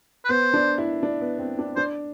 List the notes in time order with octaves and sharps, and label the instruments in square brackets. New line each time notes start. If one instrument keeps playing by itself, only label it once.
[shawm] B4
[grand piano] B3 [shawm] C5
[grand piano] D4
E4
D4
B3
C4
D4
[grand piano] D4 [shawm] C5